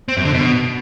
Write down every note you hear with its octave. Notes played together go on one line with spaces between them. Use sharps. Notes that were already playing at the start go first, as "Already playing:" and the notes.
C4
F#2
D3
B2